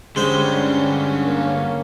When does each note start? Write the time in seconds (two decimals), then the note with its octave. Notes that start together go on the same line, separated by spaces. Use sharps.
0.16 G2 D3 G3 G#3 C#4 C5
1.24 A#3